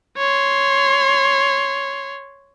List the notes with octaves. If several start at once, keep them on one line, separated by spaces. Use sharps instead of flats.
C#5 C6